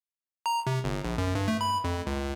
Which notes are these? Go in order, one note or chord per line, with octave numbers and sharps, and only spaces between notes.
A#5
C3
G1
A#1
F#2
G2
A3
B5
F2
C#2